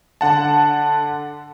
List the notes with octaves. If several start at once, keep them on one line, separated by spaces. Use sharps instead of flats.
D3 F#5 A5